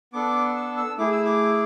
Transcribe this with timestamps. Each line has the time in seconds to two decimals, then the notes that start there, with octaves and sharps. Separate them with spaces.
0.13 B3 D4 A4 D6
0.56 E6
0.77 E6
0.98 A3 E4 G#4 D6
1.12 E6
1.26 D6